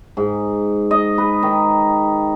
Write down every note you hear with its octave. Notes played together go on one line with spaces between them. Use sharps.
G#2
D#5
B4
D#3